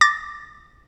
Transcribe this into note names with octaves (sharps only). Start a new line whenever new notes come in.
D6 A6 A#6